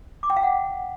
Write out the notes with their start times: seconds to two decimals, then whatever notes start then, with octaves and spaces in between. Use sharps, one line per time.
0.23 D6
0.30 G5
0.36 F5
0.43 F#5